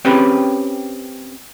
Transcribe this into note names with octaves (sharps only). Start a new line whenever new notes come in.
C4 C#4 G4 G#4 B4